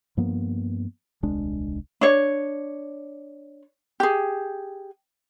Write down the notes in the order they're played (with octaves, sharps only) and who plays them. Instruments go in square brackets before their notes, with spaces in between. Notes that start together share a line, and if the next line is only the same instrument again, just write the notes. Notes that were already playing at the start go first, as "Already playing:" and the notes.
[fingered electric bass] G2 F3 A#3 B3
D#1 C2 G#3 D4
[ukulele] D4 C#5
G4 G#4